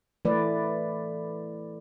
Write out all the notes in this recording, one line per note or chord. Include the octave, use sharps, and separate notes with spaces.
E3 A3 B4 D5